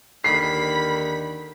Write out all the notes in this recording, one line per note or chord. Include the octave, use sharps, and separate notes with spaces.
D#2 D3 D#3 B5 C7